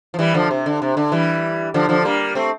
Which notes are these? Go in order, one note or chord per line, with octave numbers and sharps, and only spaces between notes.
F3
E3 G3
D3 F3
C3
D3
C3
D3
E3 G3
D3 F3
D3 F3
G3 A#3
A3 C4